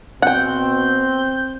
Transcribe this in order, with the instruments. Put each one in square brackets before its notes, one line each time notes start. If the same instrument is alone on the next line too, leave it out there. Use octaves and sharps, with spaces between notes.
[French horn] B2 [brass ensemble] C4 [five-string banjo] F#5 G5 [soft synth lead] G6